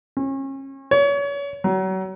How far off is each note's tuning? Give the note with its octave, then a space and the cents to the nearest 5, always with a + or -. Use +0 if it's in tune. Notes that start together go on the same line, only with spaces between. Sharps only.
C#4 -35
C#5 +35
F#3 +35